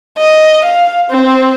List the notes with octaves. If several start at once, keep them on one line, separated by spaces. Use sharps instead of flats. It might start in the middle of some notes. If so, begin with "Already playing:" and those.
D#5
F5
C4